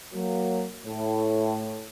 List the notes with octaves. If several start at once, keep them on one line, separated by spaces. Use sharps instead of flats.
F#3 A#3
A2